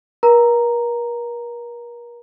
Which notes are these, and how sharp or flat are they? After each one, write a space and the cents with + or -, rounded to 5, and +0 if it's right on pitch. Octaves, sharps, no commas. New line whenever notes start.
A#4 +40 A#5 +0